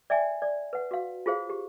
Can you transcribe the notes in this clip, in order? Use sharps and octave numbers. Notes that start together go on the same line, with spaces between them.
D5 E5 G5 G#5
D5
B4 F#5
F#4 F5
F4 G#4 C5 F5
G4